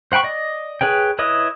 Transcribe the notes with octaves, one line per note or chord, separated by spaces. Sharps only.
C5 F#5 G5 B5 C#6
D5 D#5
G#4 B4 C#5 G5
E4 B4 C#5 D#5 D#6